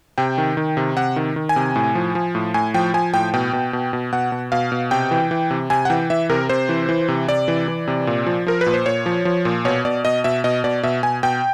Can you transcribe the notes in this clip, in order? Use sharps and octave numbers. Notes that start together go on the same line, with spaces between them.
C3 G5
D#3
D#3
C3
C3 F#5
D#3
D#3
G#5
C3
A2
F3
F3
A2
A2 G#5
F3 G5
F3 G#5
A2 G5
B2 G5
B2
B2
B2
B2 F#5
B2
B2 F5
B2
C3 G5
E3
E3
C3
C3 G#5
F#5
E3 G5
E3 E5
C3 A#4
C3 C5
E3
E3
C3
C3 D5
E3
E3
C3
A#2
F3
F3 A#4
B4
A#2
C5
A#2 C#5
F3
F3
A#2
B2 C#5
B2 D5
B2 D#5
B2 E5
B2 D#5
B2 D5
B2 E5
B2 G#5
B2 G5